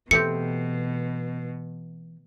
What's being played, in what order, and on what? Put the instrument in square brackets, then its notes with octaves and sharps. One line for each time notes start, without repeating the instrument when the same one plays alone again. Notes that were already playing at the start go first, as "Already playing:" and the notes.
[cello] B2 [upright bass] E3 [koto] A3 C4 G4 [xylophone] C#7